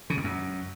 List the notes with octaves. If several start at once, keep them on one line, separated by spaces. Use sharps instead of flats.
C#3
F2
F#2